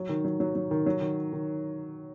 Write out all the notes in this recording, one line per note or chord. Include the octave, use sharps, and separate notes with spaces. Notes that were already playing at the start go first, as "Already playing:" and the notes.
Already playing: F#3
D#3
F#3
F#3
F#3
D#3
F#3
D#3
D#3